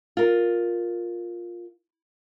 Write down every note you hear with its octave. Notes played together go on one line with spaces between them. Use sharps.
F4 A#4